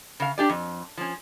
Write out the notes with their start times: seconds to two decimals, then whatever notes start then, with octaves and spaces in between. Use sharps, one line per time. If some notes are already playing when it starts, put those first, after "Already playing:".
0.20 C#3 F5
0.38 D4 G4 D5
0.49 F2
0.97 F3 C#4